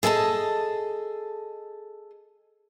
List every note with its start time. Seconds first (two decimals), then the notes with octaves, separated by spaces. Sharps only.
0.03 G#4 A4 D#5 G5 A5